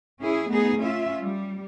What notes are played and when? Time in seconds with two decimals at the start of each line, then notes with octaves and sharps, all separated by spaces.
0.20 C#4 E4 G#4
0.48 A3 B3 D#4 G#4
0.78 C#4 F4 E5
1.21 G3